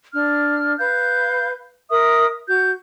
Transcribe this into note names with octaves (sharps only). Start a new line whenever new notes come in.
D4 F6
B4 F5 G6
A#4 E5 D#6
F#4 G6